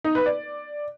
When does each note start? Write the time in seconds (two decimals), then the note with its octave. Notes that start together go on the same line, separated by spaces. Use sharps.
0.04 D#4
0.15 B4
0.26 D5